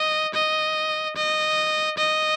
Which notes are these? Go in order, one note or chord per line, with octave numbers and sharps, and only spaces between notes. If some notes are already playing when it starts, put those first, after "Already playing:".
Already playing: D#5
D#5
D#5
D#5